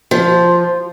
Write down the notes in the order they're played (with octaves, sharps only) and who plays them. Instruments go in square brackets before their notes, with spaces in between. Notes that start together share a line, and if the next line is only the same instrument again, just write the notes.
[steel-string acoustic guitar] F3